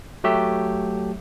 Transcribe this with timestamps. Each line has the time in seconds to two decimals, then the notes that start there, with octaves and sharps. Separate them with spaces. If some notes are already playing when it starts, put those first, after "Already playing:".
0.24 F#3 A3 G4 E5